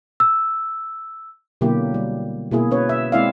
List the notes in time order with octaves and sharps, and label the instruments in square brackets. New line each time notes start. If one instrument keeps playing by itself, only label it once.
[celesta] E6
[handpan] B2 D3 F#3 A#3 E4 G4
G3
B2 A#3 E4 G#4
C#4 B4 C#5
E5
G#3 C4 E4 D5 E5 F5